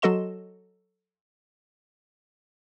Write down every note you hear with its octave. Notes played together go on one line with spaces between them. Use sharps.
F#3 F#4 A4 D#5 C6 E7